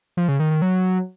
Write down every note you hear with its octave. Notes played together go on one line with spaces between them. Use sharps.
F3
C#3
D#3
D#3
F#3